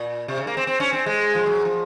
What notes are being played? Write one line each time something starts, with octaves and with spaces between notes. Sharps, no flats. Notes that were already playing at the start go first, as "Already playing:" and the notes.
Already playing: A#2
C3
C#3
A#3
C4
C4
C#4
C4
G#3
F3
F#3
F3